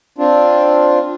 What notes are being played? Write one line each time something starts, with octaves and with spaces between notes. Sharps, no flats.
C4 D4 F4